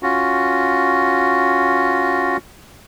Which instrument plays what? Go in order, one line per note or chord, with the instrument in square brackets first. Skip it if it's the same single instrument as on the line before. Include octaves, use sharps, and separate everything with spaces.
[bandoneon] C#4 F4 F#4